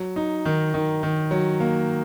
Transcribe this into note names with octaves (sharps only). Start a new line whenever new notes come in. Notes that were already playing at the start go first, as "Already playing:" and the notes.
Already playing: F#3
D#4
D#3
D#3
D#3
F#3
A#3